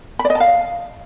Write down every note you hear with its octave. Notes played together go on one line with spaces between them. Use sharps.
B5
D5
D#5
A5
F5